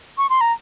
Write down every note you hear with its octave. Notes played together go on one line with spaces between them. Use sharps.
C#6
C6
A#5